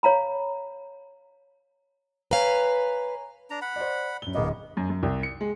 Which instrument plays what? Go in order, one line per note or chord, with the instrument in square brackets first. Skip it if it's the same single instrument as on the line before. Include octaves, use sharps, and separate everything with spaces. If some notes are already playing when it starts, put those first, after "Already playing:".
[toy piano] C#5 F5 A#5 B5
[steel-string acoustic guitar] B4 F5 [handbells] C#5 G#5 A#5
[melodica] D4 A#5
F#5 B5
[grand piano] C5 D5
F#2 G7
[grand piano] D1 D#5 [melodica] A#3 B3
[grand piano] F#2
F#2
C2
C#7
G#3